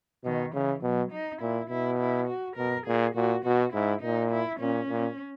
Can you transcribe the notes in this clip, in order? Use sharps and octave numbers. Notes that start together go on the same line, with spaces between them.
B2 D#3
C#3 E3
B2 F#3
D#4
A#2 E4
B2 E4
E4
F#4
B2 A#4
A#2 G#4
A#2 F#4
B2 F#4
G#2 E4
A#2 D#4
E4
A#2 C#4
A#2